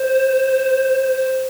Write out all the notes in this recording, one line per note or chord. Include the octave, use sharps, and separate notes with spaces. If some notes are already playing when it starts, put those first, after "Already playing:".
Already playing: C5
C5